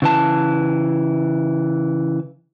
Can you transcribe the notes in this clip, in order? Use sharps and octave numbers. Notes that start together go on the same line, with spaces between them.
C#3 E3 A5